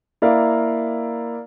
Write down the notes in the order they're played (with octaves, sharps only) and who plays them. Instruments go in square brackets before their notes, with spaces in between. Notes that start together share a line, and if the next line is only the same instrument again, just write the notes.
[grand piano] A#3 E4 A#4 D5 F5